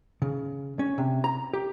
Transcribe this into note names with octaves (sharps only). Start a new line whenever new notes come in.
C#3
C#4
C3
A#5
G4